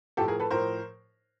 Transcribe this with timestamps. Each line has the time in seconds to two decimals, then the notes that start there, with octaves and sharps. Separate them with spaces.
0.17 A2 F3 G4 A4
0.28 G#4 A#4
0.40 A4 B4
0.51 A2 F3 A#4 C5